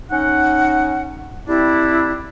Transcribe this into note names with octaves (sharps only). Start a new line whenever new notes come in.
C#4 D#4 F#5
G3 C4 D4 E4